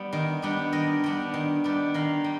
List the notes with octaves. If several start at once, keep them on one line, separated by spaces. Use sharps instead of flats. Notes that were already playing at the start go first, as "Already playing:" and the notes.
Already playing: G3 B3
D#3
G3 B3 D4
D#3 D#5
G3 B3 D4
D#3
G3 B3 D4
D#3 F5
G3